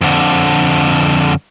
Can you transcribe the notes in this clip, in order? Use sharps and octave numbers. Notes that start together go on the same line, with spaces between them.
F2 D3